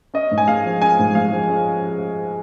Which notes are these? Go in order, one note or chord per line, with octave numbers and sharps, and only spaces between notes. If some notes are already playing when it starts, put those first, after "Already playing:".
C#4 D#5
G#2
G#5
G#3 F5
F3
C#4 G#5
G#2
G#3 F5
F3
C#4